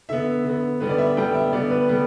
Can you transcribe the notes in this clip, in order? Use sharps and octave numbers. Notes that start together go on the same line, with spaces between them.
D3 B3 E5
D3 B3
D3 G3 B3 B4
D5
E5
D3 G3 B3 G5
E5
D3 G3 B3 D5
B4
D3 G3 B3